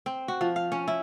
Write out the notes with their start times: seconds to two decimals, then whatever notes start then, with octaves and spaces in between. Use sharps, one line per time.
0.06 C4
0.28 F#4
0.41 F3
0.56 F5
0.72 C#4
0.88 E4